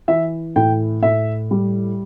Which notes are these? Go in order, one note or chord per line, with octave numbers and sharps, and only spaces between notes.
E3 E5
A2 G5
A2 E5
G3